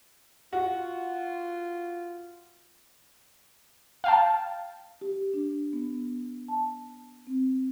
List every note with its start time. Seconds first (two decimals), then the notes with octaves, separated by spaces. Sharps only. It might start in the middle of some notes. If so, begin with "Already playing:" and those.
0.53 F4 F#4
4.04 F5 G5 A5
5.01 G4
5.34 D4
5.73 B3
6.48 A5
7.27 C4